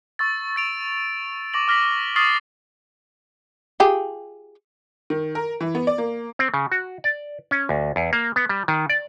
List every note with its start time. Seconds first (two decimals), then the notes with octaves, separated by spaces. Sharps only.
0.19 C#6 E6 A6
0.56 A6 D7 F7
1.54 C#6 D6 A#6 F#7
1.68 D6 F6 A#6 B6 F#7
2.16 C#6 D#6 F6 A6 C7 F#7
3.80 F4 G4 G#4
5.10 D#3
5.35 A#4
5.61 E3
5.75 B3
5.87 D5
5.98 A#3
6.39 C4
6.54 C#3
6.72 F#4
7.04 D5
7.51 C#4
7.69 D2
7.96 E2
8.13 A#3
8.36 B3
8.49 G3
8.68 D#3
8.90 D5